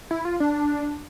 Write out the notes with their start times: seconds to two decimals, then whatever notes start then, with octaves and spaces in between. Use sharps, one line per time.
0.11 E4
0.25 F4
0.40 D4